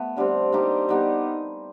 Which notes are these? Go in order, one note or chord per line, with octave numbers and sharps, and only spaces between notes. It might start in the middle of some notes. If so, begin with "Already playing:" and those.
Already playing: A3 B3
D3 G3 C4
G3 A#3 D#4 G4
G3 B3 D#4